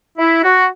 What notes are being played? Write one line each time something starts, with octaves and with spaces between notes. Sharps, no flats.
E4
F#4